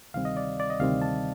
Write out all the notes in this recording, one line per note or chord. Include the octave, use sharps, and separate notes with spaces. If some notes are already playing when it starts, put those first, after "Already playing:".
D2 C3 D#3 G3 C4 F5
D#5
D5
D5
D#5
D2 C3 D#3 G3 C4 F5
A5